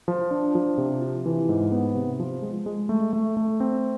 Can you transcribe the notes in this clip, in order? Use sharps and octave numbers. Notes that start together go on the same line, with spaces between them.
F3
D4
F3
C3
F4
E3
G#2
B3
C3
F3
G#3
G#3
A3
A3
A3
C4